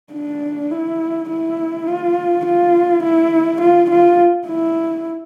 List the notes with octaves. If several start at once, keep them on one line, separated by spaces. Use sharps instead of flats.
D4
E4
E4
F4
F4
E4
F4
F4
E4